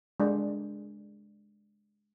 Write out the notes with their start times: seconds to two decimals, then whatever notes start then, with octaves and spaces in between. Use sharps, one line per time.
0.20 G#3 D4